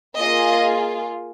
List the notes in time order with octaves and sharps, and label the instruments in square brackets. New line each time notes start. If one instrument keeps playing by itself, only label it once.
[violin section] A#3 F4 G#4 D#5